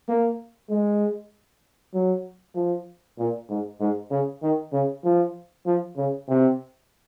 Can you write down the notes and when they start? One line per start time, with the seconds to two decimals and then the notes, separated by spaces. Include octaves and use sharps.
0.08 A#3
0.69 G#3
1.94 F#3
2.55 F3
3.18 A#2
3.49 G#2
3.80 G#2
4.11 C#3
4.42 D#3
4.73 C#3
5.04 F3
5.66 F3
5.97 C#3
6.28 C3